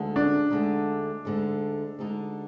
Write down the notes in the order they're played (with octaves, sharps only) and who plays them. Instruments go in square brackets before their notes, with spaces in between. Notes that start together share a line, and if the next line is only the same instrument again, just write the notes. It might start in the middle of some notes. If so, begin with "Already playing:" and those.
Already playing: [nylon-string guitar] D2 D3 G#3 D#4
[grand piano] D4
[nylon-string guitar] D2 D3 G#3 D#4
D2 D3 G#3 D#4
D2 D3 G#3 D#4